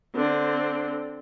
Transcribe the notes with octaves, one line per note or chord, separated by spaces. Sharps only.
D3 C4